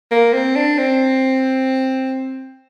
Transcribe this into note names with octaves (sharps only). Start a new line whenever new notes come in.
A#3
C4
D4
C4